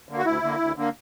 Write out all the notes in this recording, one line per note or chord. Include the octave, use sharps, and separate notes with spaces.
D3 A#3
F#4
D2 E4
D3 A#3
D2
D3 A#3